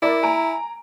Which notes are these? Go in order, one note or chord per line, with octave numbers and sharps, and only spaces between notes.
E4 A#4 D5
G#5 A#5 D7